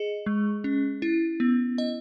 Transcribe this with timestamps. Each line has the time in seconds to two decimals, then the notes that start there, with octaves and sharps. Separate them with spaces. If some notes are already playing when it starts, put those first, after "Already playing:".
Already playing: G#4 D#5
0.26 G#3
0.64 C#4
1.02 E4
1.40 B3
1.78 D#5